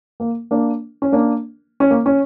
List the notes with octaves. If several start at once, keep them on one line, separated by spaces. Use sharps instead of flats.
A#3
A#3 D4
C#4
A#3 D4
C#4
A#3
C#4